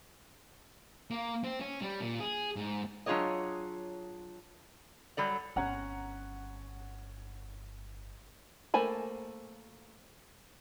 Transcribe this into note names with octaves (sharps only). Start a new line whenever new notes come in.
A#3
C4
C#4
G3
A#2
G#4
G#2
F#3 D4 F4 G#4 C#5 D#5
F#3 G3 A4 D5
G1 C4 C#4 F#5 A#5
A3 A#3 C5 G#5 B5